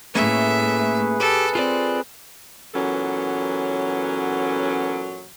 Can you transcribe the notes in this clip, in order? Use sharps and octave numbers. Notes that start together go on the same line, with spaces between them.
A2 A3 A#3 C#4 G#4 B4 E5
G4 A4
C4 F4 A4 D5
A#2 E3 F#3 B3 C#4 A4